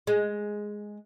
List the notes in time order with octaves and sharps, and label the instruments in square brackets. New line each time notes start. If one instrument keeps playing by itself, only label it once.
[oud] G#3